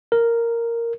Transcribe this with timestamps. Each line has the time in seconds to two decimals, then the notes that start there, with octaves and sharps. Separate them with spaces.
0.12 A#4